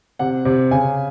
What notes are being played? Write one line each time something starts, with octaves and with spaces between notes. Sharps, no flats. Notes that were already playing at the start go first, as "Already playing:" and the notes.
C3 F#5
C3
C#3 G#5